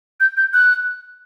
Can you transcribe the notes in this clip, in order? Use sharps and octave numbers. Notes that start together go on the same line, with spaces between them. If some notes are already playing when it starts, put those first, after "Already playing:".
G6
G6
F#6